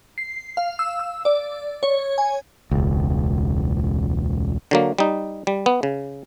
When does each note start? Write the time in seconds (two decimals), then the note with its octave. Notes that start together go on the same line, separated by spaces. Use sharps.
0.18 C7
0.57 F5
0.79 E6
0.99 E6
1.25 D5
1.83 C#5
2.18 G#5
2.71 E1 C#2
4.71 D3 F#3 A#3
4.99 G3 D#4
5.47 G3
5.66 B3
5.83 C#3